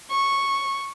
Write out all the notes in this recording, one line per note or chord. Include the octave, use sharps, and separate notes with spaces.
C#6